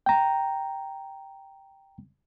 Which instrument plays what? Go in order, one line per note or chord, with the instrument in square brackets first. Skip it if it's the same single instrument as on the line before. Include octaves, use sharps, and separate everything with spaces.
[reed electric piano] G5 A#5